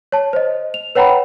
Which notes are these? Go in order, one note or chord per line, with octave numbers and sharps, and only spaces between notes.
C#5 A5
C5 D#5
F7
B4 C#5 F#5 G5 A#5 B5